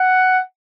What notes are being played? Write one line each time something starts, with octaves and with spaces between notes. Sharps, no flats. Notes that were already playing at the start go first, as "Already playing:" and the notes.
Already playing: F#5